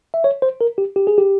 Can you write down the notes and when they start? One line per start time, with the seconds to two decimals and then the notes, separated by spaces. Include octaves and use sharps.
0.14 E5
0.24 C#5
0.42 C5
0.61 A#4
0.78 G4
0.96 G4
1.07 G#4
1.18 G4